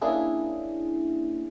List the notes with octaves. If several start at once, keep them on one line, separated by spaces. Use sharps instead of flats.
A#3 C#4 D4 E4 G#4